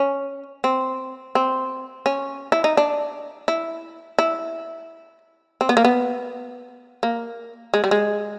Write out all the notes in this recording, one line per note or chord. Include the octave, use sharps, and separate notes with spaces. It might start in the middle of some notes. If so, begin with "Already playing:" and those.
Already playing: C#4
C4
C4
C#4
E4
D#4
D4
E4
E4
C4
B3
A#3
B3
A#3
G#3
G3
G#3